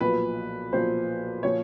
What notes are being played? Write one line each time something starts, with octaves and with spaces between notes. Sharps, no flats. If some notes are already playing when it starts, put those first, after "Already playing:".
B1 A#2 F3 B4
B1 A#2 F3 C5
A#2 F3 C#5